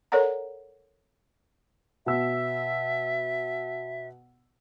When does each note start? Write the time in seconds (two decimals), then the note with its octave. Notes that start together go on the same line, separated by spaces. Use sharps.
0.12 A4 A#4 C#5 D5 F#5 A#5
2.06 B2 E5 E6